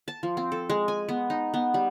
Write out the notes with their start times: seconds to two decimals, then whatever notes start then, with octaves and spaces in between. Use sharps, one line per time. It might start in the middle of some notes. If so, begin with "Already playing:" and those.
0.08 A5
0.23 F3
0.37 C4
0.52 A4
0.70 G#3
0.88 G#5
1.09 B3
1.30 D#4
1.54 B3
1.74 G3